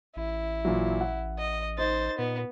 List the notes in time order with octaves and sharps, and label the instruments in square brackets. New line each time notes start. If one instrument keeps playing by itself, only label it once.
[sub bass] A1 [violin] E4
[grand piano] A#2 E3 F#3
F#5
[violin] D#5
[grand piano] D#4 [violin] C5 A6
[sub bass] A#2 [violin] B3